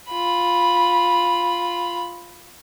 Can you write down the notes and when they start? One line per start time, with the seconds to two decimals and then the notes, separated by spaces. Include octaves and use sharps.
0.10 F4 B5